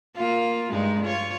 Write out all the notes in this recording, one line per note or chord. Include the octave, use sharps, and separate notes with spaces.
A#3 F4
G2 G#3 D#4
F4 C#5